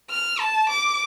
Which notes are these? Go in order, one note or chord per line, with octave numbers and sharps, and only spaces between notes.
F6
A5
D6